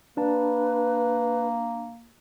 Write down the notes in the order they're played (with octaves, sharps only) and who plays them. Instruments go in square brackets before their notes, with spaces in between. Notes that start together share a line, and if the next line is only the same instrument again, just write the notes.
[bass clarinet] A#3 [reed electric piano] D4 A5 [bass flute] B4